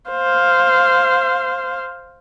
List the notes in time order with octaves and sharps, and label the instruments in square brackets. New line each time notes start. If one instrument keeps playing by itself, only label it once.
[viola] C5 F5